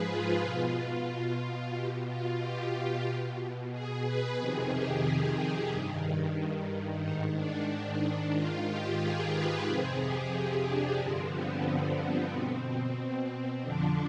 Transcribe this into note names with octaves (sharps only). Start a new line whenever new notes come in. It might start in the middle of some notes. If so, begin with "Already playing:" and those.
Already playing: G#2 F3 G#4 B4
F4
B2
B2 G4
F4
G4
B2
G#4
B4
F2 C3 D#3 G#4
G4
G2 D#3
G#2 D#3 D#4
D4
G#2 D#3 F4
G4
G#4
B4
F2 C3 F3 G#4
G4
D4
G2 D3 F3 C4
B3
C4
C4
B2
F2 D3 F3 D4